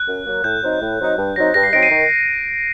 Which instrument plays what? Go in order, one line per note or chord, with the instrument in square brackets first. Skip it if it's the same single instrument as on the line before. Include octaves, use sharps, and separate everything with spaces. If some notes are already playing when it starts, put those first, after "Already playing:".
Already playing: [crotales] F#6
[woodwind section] F#2
F#3 A#3
[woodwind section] A2 [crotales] G6
[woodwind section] F#3 C4 D#4
A2
F#3 C4 D#4
G2
[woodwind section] F#3 C4 D#4 [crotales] A#6
[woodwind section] G2 [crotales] A#6
[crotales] C7
[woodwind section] F#3 C4 D#4 [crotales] A#6 D7
[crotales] C7 D#7
[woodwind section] D#3